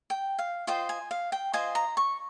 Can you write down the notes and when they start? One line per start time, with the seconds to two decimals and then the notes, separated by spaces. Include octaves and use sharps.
0.10 G5
0.39 F5
0.67 F4 C5 D#5 G5
0.89 G#5
1.11 F5
1.32 G5
1.53 F4 C5 D#5 G#5
1.75 A#5
1.97 C#6